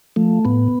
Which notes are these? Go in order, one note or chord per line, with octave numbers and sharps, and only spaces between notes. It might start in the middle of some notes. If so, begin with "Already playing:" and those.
F3 A3
A2 B3